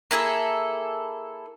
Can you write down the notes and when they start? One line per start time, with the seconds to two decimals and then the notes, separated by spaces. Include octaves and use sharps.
0.11 A#3 E4 G#4 A4